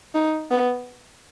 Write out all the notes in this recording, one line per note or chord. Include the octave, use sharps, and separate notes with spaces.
D#4
B3